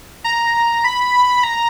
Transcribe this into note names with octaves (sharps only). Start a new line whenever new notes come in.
A#5
B5
A#5